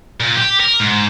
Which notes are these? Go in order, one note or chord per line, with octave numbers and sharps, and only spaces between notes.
A#2
G4
A#4
G#2